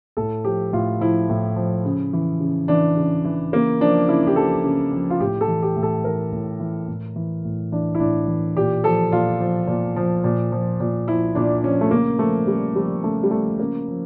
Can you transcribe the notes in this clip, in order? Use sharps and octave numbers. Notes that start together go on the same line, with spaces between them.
A2 A4
F3 G4
A2 F4
F3 E4
A2
F3
C#3
E3
C#3
E3 D4
C#3
E3
C#3 A#3
F3 D4
C#3 E4
G4
F3 A4
C#3
F3
F4
A2 G4
A4
E3
G4
A2
A4
E3 A#4
A2
E3
A2
E3
A2
E3 D4
E4
A2 D4
E3
A#2 G4
F3 A4
A#2 F4
F3
A#2
F3
A#2
F3
A#2
F3 E4
A#2 D4
F3 C#4
A3
C#3 A#3
F3 A3
C#3 G3
F3 G3
C#3 A3
G3
F3 A3
C#3 A#3
F3